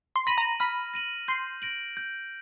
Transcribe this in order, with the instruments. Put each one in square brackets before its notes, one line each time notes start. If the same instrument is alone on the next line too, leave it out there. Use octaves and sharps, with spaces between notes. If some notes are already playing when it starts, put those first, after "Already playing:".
[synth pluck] C6
[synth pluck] B5 [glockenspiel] A#6 D#7 F#7
[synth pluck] A#5
[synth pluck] B5 [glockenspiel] F6
[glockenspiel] A#6 D#7 F#7
[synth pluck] C6 [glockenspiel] G6
[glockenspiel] A#6 D7 F#7
G6